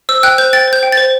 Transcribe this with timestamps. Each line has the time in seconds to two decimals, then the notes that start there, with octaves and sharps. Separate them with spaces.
0.09 C5 E6
0.23 G5 F#6
0.38 C5 G6
0.53 G5 A6
0.68 C5
0.73 G6
0.83 G5
0.92 A6
0.97 C5